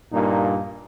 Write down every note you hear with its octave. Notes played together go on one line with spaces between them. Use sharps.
G2 A#2 A#3 D#4